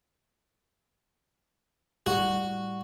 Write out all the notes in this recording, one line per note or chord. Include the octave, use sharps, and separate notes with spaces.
A2 G3 F#4